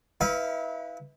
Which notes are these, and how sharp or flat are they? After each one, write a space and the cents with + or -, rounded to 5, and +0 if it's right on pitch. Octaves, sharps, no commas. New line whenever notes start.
E4 -35 B4 +0 F5 -25